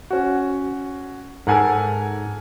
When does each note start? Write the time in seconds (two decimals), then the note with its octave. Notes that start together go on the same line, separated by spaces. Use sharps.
0.10 C#4 F#4
1.47 G#2 A4 A#4 F#5 G#5